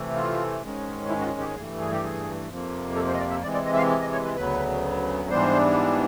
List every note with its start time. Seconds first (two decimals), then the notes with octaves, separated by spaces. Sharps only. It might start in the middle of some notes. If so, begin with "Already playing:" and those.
Already playing: C3 E3 A3
0.15 F4
0.62 G#2 D#3 G#3 C#4
1.09 E4
1.20 F#4
1.24 F4
1.40 G4
1.55 G2 E3 A3 G#4
1.79 G#4
1.92 G4
2.04 G#4
2.49 F2 C3 F3 A#3
2.96 A4
3.07 C5
3.14 D#5
3.19 D5
3.31 E5
3.42 C3 E3 G#3 D5
3.54 D5
3.66 D#5
3.73 E5
3.78 F5
4.01 D#5
4.12 C#5
4.25 B4
4.36 D2 C#3 F#3 B3 B4
5.30 G#2 E3 G3 B3 D4 C5